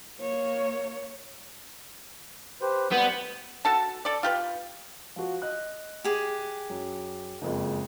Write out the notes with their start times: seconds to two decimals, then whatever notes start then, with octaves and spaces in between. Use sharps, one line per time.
0.20 A#3 C#5
2.61 G4 B4 C5
2.91 G3 B3 G6
3.65 F#4 A4 A5
4.05 A4 D5
4.23 F4 G4 B4
5.16 F3 F#4
5.42 D#5 F#6
6.04 G4 G#4
6.70 F#2
7.42 F#1 F2 G#3